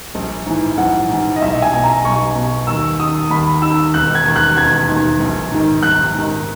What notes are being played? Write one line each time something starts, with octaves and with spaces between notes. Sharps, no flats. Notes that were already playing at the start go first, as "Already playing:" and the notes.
A#1
G#2 E3
A#1 F#5
G#2 E3
D#5
B1 E5
G#5
B2
A#5
B1 C#6
B2
D#2 E6
D#3 D#6
D#2 B5
D#3 E6
E1 F#6
G#6
D#2 D#3
F#6
E1 G#6
D#2 D#3
A#1
G#2 D#3
A#1 F#6
G#2 D#3